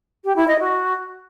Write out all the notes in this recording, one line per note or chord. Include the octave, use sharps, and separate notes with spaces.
G4
E4
D#5
F#4